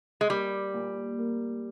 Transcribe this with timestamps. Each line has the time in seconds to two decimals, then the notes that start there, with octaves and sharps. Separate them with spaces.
0.21 G#3
0.30 G3 A#3
0.74 A#2
1.19 A#3